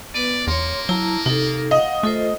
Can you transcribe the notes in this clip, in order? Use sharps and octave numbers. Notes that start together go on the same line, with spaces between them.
B3 B4 D5
E2 A#3 C#5 C6
F#3 E4 A5 A#5
C3 D#4 A4
D#5 F5 F#5
A3 F4 A4 C5